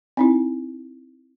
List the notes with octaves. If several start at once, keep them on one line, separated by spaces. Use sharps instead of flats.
C4 D#4 E4